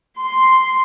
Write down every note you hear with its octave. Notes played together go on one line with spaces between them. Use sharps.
C6